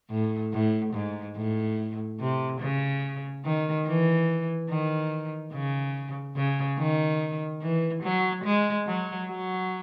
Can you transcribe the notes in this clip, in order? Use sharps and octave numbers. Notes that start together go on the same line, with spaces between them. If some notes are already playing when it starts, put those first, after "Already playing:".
A2
A2
G#2
A2
C3
C#3
D#3
E3
D#3
C#3
C#3
D#3
E3
F#3
G#3
F#3
F#3